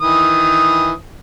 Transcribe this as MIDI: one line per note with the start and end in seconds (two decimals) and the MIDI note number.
0.01 0.92 51
0.01 0.92 52
0.01 0.92 87